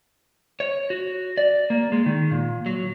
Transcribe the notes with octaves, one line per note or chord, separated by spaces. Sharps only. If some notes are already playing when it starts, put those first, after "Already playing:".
C#5
F#4
D5
A#3
G#3
D#3
A#2
F#3